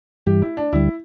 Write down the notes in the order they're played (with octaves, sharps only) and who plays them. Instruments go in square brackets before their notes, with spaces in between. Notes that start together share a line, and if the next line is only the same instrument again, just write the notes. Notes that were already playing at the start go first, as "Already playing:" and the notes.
[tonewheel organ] G2 E3 G3 [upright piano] G4
[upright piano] E4
D4
[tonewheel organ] D2 D3 G3 [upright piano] E4